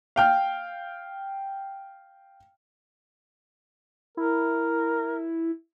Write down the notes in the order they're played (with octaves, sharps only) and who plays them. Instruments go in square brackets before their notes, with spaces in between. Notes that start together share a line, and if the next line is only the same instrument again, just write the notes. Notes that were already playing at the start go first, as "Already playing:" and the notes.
[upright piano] F5 G5 F6
[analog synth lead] E4 [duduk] A#4